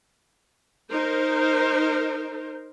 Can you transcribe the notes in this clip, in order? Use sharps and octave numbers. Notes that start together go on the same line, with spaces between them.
D#4 A#4 C5